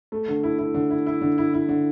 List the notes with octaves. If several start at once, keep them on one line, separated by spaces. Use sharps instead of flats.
A3
D3
E4
E4
D3
E4
E4
D3
E4
E4
D3